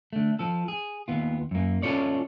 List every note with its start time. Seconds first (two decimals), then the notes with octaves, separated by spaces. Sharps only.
0.13 D3 A3
0.39 F3 A4
0.68 G#4
1.08 D#2 B3 F4
1.51 F#2 A#3
1.82 C#4 F4 A4 C#5 D5